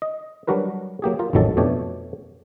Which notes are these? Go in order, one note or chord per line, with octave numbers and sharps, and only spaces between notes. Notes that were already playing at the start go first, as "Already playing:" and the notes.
D#5
F#3 G3 D4 F#4 A#4 B4
F#3 A#3 G4 G#4
F4 A#4
A1 F2 D#3 F#3 A4 A5
F2 B2 A3 D4 G4 C#5